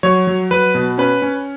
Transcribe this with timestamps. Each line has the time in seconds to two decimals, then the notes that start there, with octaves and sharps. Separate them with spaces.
0.03 F#3 C#5
0.27 F#3
0.51 F#3 B4
0.75 B2
0.98 C#4 B4
1.22 C#4